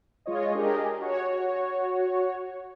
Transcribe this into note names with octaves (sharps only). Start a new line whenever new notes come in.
G#3 F4 C#5 D#5
D4 G4 G#4 A#4 D#5
F#4 C#5